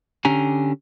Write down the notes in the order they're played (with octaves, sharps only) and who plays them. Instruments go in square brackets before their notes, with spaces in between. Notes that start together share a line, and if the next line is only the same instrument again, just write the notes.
[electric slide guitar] D3 C#4 G4 G#5 A#5